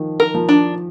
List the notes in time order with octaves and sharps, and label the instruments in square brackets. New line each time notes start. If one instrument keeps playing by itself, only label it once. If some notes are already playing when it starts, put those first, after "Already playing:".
Already playing: [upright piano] D#3 F3
[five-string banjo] A#4
[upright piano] F3
[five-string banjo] D4